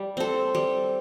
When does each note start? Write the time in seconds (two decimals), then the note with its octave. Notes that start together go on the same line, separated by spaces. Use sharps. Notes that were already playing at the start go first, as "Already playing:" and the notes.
Already playing: G3
0.17 C4 A4
0.55 G3